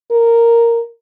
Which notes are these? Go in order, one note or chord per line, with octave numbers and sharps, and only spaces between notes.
A#4